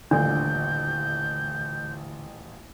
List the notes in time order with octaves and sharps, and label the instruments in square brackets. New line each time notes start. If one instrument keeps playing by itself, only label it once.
[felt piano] D#1 A1 F4 [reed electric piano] D3 [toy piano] D4 [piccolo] G6